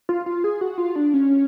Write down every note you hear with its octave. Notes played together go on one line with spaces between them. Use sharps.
F4
F4
G#4
F#4
F4
D4
C#4